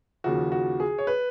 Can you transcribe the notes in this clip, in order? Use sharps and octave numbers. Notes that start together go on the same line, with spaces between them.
D#2 C#3 F3 F#4
F#4
G#4
C#5
B4